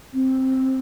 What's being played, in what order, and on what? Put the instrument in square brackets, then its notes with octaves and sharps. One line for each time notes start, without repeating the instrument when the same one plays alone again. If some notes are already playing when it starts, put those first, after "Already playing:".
[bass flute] C4